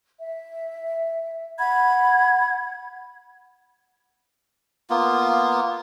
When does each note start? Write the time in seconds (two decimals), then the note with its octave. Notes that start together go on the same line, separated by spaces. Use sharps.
0.20 E5
1.59 F#5 B5 G#6
4.90 A#3 B3 F4